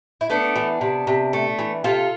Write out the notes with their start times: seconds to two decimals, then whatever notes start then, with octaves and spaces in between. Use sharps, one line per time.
0.21 E4
0.30 A3 B3 D4
0.56 E3
0.81 C3
1.07 C3
1.33 A3
1.59 E3
1.84 C3 F4 A4